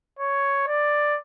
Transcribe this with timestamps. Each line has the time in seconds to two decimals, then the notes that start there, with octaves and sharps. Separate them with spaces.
0.19 C#5
0.67 D5